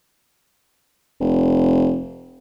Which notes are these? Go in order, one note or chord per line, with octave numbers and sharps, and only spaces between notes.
F1